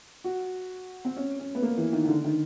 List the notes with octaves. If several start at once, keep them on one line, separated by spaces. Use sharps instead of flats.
F#4
C4
C#4
C#4
B3
A#3
E3
D#3
D#3
D3
D#3